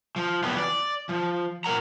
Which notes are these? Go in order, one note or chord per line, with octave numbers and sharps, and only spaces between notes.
F3
E3 F#3 G3 B3
D5
F3
A#2 A#4 F#5 A#5